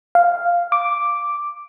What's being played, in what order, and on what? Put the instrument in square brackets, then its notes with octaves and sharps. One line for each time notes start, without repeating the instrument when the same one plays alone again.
[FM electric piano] F5
D6